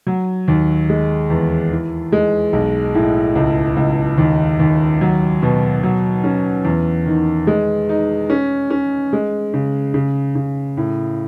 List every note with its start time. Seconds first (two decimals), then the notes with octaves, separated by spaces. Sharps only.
0.07 F#3
0.48 D#2
0.89 G#3
1.30 E2
1.71 E3
2.12 G#3
2.53 B1
2.95 A2
3.35 C#2
3.76 C#2
4.18 D#2
4.59 D#2
5.01 F#3
5.42 B2
5.83 F#3
6.24 C#4
6.65 E2
7.06 D#3
7.47 G#3
7.89 D#4
8.30 C#4
8.70 C#4
9.13 G#3
9.54 C#3
9.94 C#3
10.35 C#3
10.77 A2